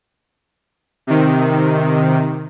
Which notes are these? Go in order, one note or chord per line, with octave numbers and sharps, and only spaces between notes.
C3 D#3